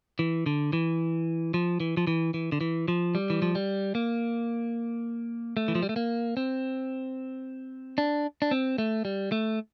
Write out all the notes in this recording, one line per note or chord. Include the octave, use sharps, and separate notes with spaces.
E3
D3
E3
F3
E3
F3
E3
E3
D3
E3
F3
G3
E3
F3
G3
A#3
A3
E3
F3
G3
A3
A#3
C4
D4
D4
C4
A3
G3
A3